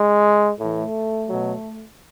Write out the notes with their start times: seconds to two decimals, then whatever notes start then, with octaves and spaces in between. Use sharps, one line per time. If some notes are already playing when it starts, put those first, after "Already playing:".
Already playing: G#3
0.59 A2 E3 A3
1.29 B2 F#3